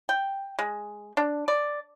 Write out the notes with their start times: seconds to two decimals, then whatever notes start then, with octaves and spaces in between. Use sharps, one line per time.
0.09 G5
0.59 G#3
1.17 D4
1.48 D5